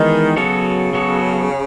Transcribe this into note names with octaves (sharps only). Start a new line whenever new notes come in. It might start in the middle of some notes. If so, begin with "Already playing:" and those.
Already playing: D#3 E3 G#3 B3 D#4
C#3 F#3 B3 F#4 A4 C#5
F#3 B3 F#4 A4 C#5